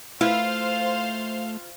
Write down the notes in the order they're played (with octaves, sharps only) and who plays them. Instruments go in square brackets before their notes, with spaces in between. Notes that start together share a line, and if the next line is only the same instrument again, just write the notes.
[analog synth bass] A3 [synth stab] E4 B4 E5 [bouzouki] F4 [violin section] C5 F5